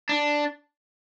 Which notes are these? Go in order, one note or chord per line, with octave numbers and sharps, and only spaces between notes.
D4